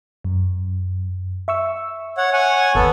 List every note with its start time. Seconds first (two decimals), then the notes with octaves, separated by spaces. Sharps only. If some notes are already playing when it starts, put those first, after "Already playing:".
0.24 F#2
1.48 E5 C#6 E6
2.17 C#5 F#5
2.33 C#5 F#5 G#5
2.75 G1 D#2 B3 A4